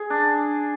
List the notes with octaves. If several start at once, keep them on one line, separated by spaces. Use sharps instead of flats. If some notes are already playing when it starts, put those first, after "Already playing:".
Already playing: G#4
D4